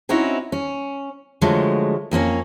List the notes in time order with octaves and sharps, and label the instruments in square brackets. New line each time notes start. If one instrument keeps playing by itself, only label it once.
[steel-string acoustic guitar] C4 C#4 D#4 E4 F#4 C#5
C#4
D3 F3 F#3 G#3 A3
F2 A#3 C4 C#4